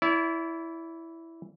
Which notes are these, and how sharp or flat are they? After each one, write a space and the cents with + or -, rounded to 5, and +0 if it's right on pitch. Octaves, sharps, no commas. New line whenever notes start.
E4 +0 D5 -40